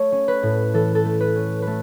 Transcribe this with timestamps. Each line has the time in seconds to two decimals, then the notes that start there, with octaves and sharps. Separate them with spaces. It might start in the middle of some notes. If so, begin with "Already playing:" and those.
Already playing: A3 C#5
0.12 C#4
0.28 B4
0.43 A2
0.74 E3 A4
0.95 A4
1.05 A3
1.21 B4
1.36 C#4
1.62 A3 B4